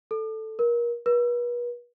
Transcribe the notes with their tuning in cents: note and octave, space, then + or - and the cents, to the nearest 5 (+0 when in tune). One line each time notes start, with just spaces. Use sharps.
A4 +0
A#4 +30
B4 -40